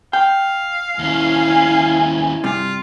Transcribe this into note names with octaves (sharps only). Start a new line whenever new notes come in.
F5 G5
D#2 C#4 E4 G#5
G2 C3 F4